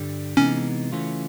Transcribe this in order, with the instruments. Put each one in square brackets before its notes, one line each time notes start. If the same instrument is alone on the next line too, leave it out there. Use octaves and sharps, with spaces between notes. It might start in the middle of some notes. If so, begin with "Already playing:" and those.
Already playing: [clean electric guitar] G2 D3 G3
[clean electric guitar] C3 E3 G#3 B3 D#4 [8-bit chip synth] C#4
[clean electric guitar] C#3 E3 A3 C#4 F4